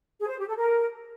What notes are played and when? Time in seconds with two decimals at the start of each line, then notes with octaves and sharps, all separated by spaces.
0.20 G#4
0.29 C5
0.39 G4
0.48 A4
0.57 A#4